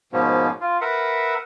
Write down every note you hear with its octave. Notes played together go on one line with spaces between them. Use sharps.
G#2 B2 F3 A#3 B3 C#4
F4
A#4 B4 E5 F#5